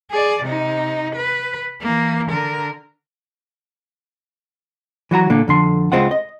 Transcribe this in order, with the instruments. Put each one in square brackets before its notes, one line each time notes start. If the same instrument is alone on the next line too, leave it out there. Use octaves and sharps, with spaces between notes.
[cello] G#4 D5
C3 D#4
B4
E3 A#3
D3 A#4
[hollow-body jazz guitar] E3 F#3 F#4 A#5
A#2 D3 A#3
F2 D3 C6
C#2 F#3 G#3 C4 F4 F#5
D#5